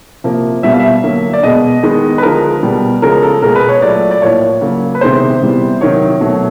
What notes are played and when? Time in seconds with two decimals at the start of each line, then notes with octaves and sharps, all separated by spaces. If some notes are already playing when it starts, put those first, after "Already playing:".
0.24 C3 F3 A#3
0.63 B2 G3 B3 E5
0.71 F5
0.79 E5
1.03 D3 F#3 A#3
1.33 D5
1.43 B2 G#3 B3 D#5
1.83 D#3 G#3 B3
2.18 B4
2.22 D3 F3 G#3 A#4
2.63 B2 G3 B3
3.02 C#3 F3 G#3 A#4
3.23 A4
3.42 B2 G#3 B3 A#4
3.56 B4
3.69 C#5
3.82 A#2 F#3 A3 D5
4.11 D5
4.22 A2 F3 A#3 C#5
4.61 C#3 F#3 A#3
4.95 B4
5.01 C3 D#3 G#3 B3 C5
5.42 C3 E3 G3 B3
5.81 C3 D#3 F#3 C#5
6.20 B2 F#3 A3